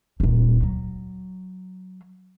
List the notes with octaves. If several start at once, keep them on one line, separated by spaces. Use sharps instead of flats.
D1 A#2
F#3